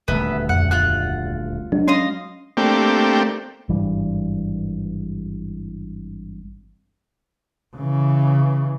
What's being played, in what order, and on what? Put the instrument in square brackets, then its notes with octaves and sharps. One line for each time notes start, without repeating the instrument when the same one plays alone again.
[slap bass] D#1 D2 A3 [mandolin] B3 E5
[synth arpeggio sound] F2 [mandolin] F#5
[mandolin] F4 F#5 F#6
[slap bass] F#3 G#3 [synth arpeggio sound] D4
[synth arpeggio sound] C#4 [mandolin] D#5 F5 C6
[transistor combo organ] A3 A#3 C4 D4 G4
[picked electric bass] G#1 G2 E3 G3
[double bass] C#3 E3